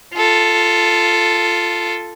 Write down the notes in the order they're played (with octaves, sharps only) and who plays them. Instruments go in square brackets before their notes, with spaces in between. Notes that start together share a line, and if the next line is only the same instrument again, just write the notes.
[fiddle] F4 A4